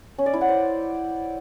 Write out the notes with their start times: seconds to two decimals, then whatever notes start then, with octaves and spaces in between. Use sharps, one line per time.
0.18 C#4
0.26 D5
0.34 E4
0.41 F#5
0.49 C5